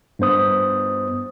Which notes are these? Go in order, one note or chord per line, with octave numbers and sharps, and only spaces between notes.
G2 B3 C5 D#6